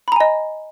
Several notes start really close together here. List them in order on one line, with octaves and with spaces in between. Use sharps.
B5 A#5 G#5 D#5